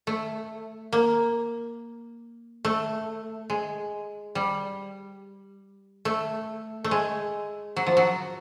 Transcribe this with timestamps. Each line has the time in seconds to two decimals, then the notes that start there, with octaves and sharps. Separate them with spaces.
0.07 A3
0.93 A#3
2.65 A3
3.50 G#3
4.35 G3
6.05 A3
6.84 A3
6.91 G#3
7.76 F#3
7.87 F3
7.97 F#3